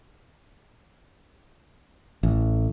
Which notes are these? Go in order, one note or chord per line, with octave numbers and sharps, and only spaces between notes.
A1